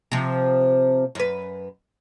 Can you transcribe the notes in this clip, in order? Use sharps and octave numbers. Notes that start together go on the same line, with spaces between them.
C3 F3
F#2 B4